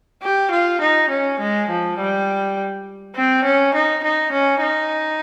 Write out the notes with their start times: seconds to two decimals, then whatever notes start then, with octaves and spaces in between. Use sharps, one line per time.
0.22 G4
0.51 F4
0.81 D#4
1.10 C#4
1.40 G#3
1.69 F3
1.98 G3
3.15 C4
3.44 C#4
3.74 D#4
4.04 D#4
4.32 C#4
4.61 D#4